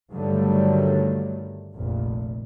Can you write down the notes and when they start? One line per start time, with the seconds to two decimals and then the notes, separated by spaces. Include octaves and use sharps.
0.12 G2 D3 D#3 F#3 G3 A3
1.74 F1 A#1 A#2